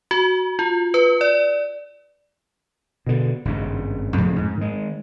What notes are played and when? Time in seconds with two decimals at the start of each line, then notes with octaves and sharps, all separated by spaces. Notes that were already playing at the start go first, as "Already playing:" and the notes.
0.11 F#4
0.59 F4
0.94 B4
1.21 D5
3.06 B2 D3
3.45 G#1 G2 C#3
4.18 F2 A2 C#3
4.36 G#2
4.58 D#3 G#3